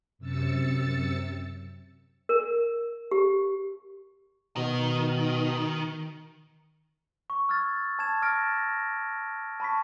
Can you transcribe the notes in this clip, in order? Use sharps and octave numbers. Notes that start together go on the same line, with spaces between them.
F#2 C3 E6 A6 C#7
A#4
G4
B2 D#3
C#6
E6 F6 G#6 A6
A5 G#6 E7
D6 E6 F6 A6 A#6 D7
A#6
A5 B5 C#6 B6